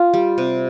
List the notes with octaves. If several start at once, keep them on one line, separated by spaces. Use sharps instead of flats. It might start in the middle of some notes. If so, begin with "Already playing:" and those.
Already playing: F4
G3
C3